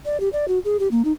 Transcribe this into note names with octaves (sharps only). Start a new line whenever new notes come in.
D5
G4
D5
F#4
G#4
G4
A#3
D#4